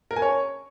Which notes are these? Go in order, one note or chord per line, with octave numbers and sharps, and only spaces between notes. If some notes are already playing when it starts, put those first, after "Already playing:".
A#4
G#5
C#5